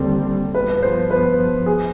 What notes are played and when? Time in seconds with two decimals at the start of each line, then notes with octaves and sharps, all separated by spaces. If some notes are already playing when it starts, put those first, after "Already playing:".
Already playing: D#2 D3 G3 C4
0.54 G2 F3 B3 B4
0.82 C5
1.10 B4
1.66 G#4